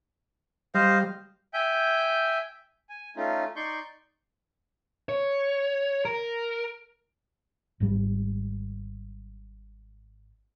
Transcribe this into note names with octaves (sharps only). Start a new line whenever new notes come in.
G3 C5 D#5 F5
E5 G5 G#5 G6
G#5
A3 C#4 D#4 F4
D#4 D5 C6 C#6 G6
C#5
A#4
G#1 G#2 G3